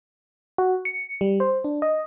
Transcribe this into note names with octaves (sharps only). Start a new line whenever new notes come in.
F#4
C#7
G3
C5
D4
D#5